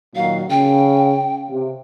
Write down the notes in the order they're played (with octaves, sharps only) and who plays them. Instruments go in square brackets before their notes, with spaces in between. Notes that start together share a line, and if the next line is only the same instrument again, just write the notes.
[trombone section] A#2 D#3 F#3 [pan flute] F5
[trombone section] C#3 [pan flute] G5
[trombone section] C3